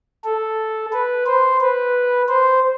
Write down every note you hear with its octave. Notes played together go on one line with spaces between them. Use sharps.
A4
B4
C5
B4
C5